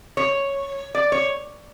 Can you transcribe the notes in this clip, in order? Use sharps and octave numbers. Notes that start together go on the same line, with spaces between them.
C#5
D5
C#5